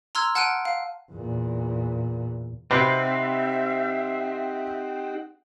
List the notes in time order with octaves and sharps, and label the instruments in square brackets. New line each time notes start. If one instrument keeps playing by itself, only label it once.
[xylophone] A#5 C6 E6 F6 G#6
F#5 A5 F6 F#6 D7 D#7
F5
[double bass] E2 A#2
[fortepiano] C3 B4 [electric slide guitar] C4 [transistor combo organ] D#4 G4 F#5 [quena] E5